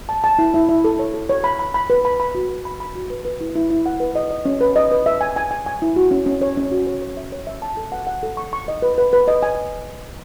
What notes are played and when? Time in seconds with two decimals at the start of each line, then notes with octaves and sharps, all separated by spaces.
0.09 A5
0.24 A5
0.39 E4
0.54 E4
0.69 E4
0.84 A4
0.99 C#5
1.14 A4
1.29 C#5
1.44 B5
1.59 B5
1.74 B5
1.90 B4
2.05 B5
2.20 B5
2.35 F#4
2.49 B4
2.65 B5
2.80 B5
2.95 F#4
3.10 B4
3.25 B4
3.41 E4
3.56 E4
3.70 E4
3.86 F#5
4.00 B4
4.15 D#5
4.31 D#5
4.45 C#4
4.61 B4
4.76 D#5
4.91 B4
5.06 E5
5.21 G#5
5.36 G#5
5.51 G#5
5.66 G#5
5.82 E4
5.96 F#4
6.11 C#4
6.26 C#4
6.41 C#5
6.57 C#4
6.71 F#4
6.87 C#5
7.02 C#5
7.17 E5
7.32 C#5
7.47 E5
7.62 A5
7.77 A4
7.92 F#5
8.07 F#5
8.23 A4
8.37 C#6
8.53 C#6
8.68 D#5
8.82 B4
8.98 B4
9.13 B4
9.28 D#5
9.43 G#5